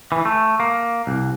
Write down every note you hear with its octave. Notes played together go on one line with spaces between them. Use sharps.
E3
A3
A#3
C2